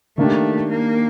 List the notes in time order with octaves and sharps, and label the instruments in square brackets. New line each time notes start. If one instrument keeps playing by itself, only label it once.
[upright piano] D#3 A#3 D4 G4 [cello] A3
[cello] A#3